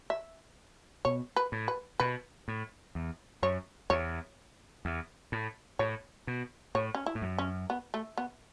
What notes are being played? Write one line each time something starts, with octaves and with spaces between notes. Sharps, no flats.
E5
B2 C#5
B4
A2
B4
B2 B4
A2
E2
F#2 C#5
E2 C#5
E2
A2
A2 C#5
B2
A2 C#5
C#4
E4
A2
F#2
C#4
B3
A3
B3